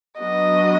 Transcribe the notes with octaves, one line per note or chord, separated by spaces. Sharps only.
F#3 B3 D4 F#4 D#5